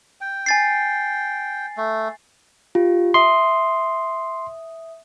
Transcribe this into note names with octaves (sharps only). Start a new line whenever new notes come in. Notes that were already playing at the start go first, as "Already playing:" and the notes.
G5
G#5 A6 C7
A3
F4 G4
E5 C6 D#6